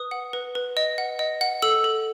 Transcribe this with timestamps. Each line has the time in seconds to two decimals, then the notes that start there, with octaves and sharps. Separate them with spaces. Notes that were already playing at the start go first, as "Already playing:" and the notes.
Already playing: B4 D#6
0.11 F#5
0.33 B4
0.55 B4
0.77 D#5
0.98 F#5
1.19 D#5
1.41 F#5
1.62 A4 E6
1.84 A4